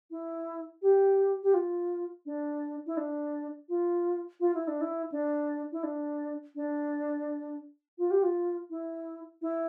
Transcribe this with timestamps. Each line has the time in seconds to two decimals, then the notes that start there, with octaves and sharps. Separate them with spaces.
0.11 E4
0.82 G4
1.43 G4
1.54 F4
2.26 D4
2.87 E4
2.97 D4
3.69 F4
4.40 F4
4.54 E4
4.68 D4
4.81 E4
5.12 D4
5.72 E4
5.83 D4
6.56 D4
7.98 F4
8.11 G4
8.23 F4
8.70 E4
9.42 E4